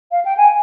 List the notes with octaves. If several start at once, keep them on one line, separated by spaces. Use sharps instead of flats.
F5
G5
G#5